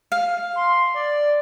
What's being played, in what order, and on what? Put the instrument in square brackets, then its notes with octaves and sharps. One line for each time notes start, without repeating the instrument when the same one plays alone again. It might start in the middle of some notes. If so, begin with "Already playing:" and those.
[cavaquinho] F5
[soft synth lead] C6
D5